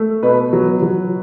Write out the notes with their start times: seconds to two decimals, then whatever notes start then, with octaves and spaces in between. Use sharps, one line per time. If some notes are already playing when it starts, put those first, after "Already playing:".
Already playing: A3
0.23 B2 B4
0.53 F#3
0.82 F#3